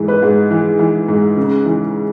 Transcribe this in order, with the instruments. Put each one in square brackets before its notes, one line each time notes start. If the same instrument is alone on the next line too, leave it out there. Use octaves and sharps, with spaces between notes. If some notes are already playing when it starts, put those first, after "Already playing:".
Already playing: [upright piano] G#2 E3
B4
G#2
E3
E3
G#2
C#3
E3